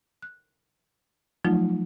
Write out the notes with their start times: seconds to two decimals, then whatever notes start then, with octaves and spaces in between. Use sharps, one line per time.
0.22 F#6
1.45 F3 F#3 A3 D#4 F4